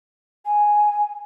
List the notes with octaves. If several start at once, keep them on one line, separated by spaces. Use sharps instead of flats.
G#5